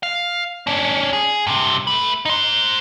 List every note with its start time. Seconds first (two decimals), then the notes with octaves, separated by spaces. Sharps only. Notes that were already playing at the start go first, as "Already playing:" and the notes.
0.03 F5
0.67 C#4 D4
1.13 G#4
1.47 G2 C3
1.87 A3 B4
2.25 D#4 C5